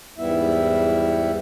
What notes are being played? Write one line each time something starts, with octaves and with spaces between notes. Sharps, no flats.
E2 G#2 G3 B3 E4 E5